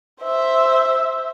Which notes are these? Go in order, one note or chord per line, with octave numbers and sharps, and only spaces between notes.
C5 E5